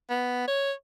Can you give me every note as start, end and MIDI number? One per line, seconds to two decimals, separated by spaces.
0.10 0.45 59
0.48 0.72 73